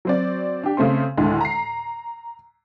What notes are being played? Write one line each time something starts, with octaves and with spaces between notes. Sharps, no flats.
F#3 C4 D5
D4 G4
C#3 A3 C4 C6
D2 A2 D3 G#3
A#5 C7